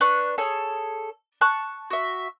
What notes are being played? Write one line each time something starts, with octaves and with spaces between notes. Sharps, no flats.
D4 B4 C#6 F#6
G#4 A4 C#5
A5 C#6 F#6
F#4 E5